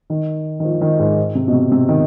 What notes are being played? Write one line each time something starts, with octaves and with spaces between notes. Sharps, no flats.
D#3
D#3
F3
D#3
G#2
C3
B2
C3
C3
D#3